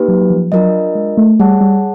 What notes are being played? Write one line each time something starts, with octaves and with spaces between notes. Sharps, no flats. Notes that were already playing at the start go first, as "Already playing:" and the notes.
Already playing: A#3 D#4 G4 B4
F#3
F#3
F3
F#3 D4 F4 A#4 D#5
G#3
A3
G3 G#4 C#5 F#5 A5
G3